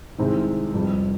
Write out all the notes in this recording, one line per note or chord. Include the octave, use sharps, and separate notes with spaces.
C2 C3 D#3 G#3 C4
F1 F2 C3 G3